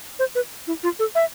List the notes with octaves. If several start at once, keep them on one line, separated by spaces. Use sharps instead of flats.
C5
B4
E4
F4
A4
E5